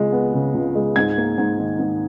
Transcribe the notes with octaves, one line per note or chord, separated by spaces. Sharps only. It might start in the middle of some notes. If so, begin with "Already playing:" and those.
Already playing: C#2 G#3
B3
C#3
C#2
G#3
G#2 G#6
A#3
G#2
D#3
G#2